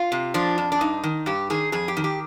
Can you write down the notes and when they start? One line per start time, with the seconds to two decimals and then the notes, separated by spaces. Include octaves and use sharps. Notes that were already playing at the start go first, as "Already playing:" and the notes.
Already playing: F4
0.12 C3
0.34 F3 D4
0.58 F2
0.72 D4
0.81 G2 D#4
1.04 D#3
1.26 G2 G4
1.50 D#3 G#4
1.72 F2 G#4
1.88 G4
1.97 D#3
2.04 G4